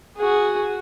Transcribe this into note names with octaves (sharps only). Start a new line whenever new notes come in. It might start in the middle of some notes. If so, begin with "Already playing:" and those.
F#4 G#4